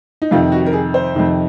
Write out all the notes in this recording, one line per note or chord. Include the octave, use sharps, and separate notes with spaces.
D#4
F2 C3 D#3 F4
F#4
A#4
G#4
C5
F2 C3 D#3